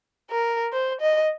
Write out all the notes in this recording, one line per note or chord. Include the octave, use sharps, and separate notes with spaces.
A#4
C5
D#5